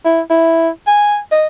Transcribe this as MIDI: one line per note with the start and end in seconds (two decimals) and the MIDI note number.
0.05 0.21 64
0.30 0.69 64
0.87 1.18 80
1.32 1.47 75